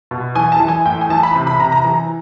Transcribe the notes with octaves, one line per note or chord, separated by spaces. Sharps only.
B2
E3 G#5
A5
E3
G#5
A2 G5
G#5
E3 A5
B5
C3
B5
C3 A#5
A#5
E3 A#5